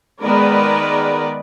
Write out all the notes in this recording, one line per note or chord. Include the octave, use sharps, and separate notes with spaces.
D#3 G#3 B3 A#4 B4 D5